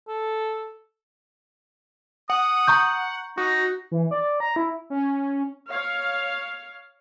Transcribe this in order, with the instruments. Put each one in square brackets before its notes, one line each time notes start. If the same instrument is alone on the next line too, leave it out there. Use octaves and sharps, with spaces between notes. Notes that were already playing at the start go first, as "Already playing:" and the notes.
[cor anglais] A4
[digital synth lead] F#5 [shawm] D#6
[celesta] A#5 C#6 G6
[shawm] D#4 [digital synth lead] F#4
[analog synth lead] E3
D5
A#5
E4
[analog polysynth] C#4
[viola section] C#5 F5